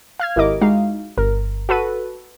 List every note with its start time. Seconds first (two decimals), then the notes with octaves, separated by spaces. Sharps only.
0.20 F5 F6 G#6
0.36 G#1 E4 G4 A#4 D#5 D6
0.62 G#3 D#4 E4 F#4 F5
1.17 G1 A#4
1.69 F#4 A4 B4 D#7